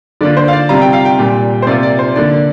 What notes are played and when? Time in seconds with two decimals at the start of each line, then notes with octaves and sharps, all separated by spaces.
0.21 D3 A#3 D4 F4 D5
0.37 C5
0.48 F5
0.53 D5
0.69 C3 G3 C4 F4 A#5
0.82 G5
0.93 F5
1.05 G5
1.18 A#2 G3 A#3
1.62 C5
1.67 C3 A#3 F4 D5
1.83 D5
1.99 C5
2.16 D3 A#3 D4 D5